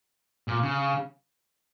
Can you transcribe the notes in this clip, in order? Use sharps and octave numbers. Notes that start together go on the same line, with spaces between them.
A#2
C#3